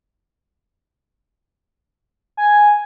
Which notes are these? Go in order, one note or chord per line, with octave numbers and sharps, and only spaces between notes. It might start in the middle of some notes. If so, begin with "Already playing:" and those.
G#5